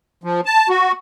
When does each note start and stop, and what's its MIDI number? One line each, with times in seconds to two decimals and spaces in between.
0.24 0.41 53
0.46 0.69 81
0.69 0.92 66